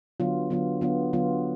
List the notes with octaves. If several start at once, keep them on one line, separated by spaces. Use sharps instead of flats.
D3 F#3 B3 F4
D3 F#3 B3 F4
D3 F#3 B3 F4
D3 F#3 B3 F4